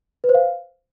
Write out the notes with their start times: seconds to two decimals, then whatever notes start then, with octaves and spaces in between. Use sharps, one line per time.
0.24 B4
0.29 C5
0.35 F5